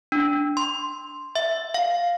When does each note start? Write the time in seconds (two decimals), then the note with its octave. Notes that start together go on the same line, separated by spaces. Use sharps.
0.12 D4
0.57 C6
1.35 E5
1.74 F5